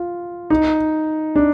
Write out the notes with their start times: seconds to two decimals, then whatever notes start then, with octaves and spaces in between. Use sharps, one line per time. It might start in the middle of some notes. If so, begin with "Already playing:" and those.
Already playing: F4
0.50 D#4
1.36 D4